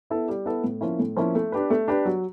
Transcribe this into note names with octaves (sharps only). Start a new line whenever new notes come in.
B3 E4 A4
G3
B3 E4 A4
A2
F3 A#3 C#4 E4
A2
F3 A#3 C#4 E4
A3
D4 G4 B4
A3
D4 G4 B4
F#3